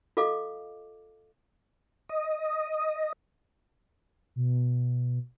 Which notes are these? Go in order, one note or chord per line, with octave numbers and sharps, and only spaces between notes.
F4 A4 D#5 F5 D6
D#5
B2